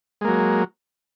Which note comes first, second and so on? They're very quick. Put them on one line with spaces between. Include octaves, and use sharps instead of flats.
G#3 A#3 F#3